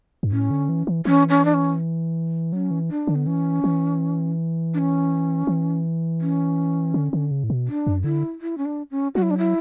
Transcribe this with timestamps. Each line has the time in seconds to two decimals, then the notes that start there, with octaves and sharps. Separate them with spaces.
0.23 G2
0.31 A2 C#4
0.51 D3
0.69 E3
0.87 E3
1.05 E3 C#4
1.30 C#4
1.45 D4
1.54 C#4
2.53 F#3 C#4
2.71 E3
2.89 D4
3.07 D3
3.15 B3
3.26 E3 C#4
3.64 E3
4.74 D4
4.79 C#4
5.47 E3
6.21 C#4
6.94 D3
7.13 D3
7.31 C#3
7.44 A2
7.50 B2
7.68 D4
7.87 F#2
8.04 D3 E4
8.41 E4
8.58 C#4
8.65 D4
8.91 C#4
9.15 F#3 F#4
9.23 E4
9.31 D4
9.38 E4